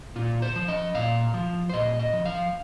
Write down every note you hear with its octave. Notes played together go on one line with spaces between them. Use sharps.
A#2 F4
C5
F3
D#5
A#2 F5
F3
C5
A#2 D#5
D#5
F3
F5